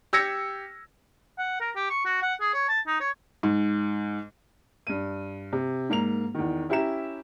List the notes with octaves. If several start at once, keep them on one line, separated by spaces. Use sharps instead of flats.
G4 E6 G#6 A#6 C#7
F#5
A#4
G4
C#6
F#4
F#5
G#4
C#5
A5
D#4
C#5
G#2
G2 D#7
C3
G#2 A#3 A#5 F7
E2 D#3
C#4 E4 G4 E5 A#5 E7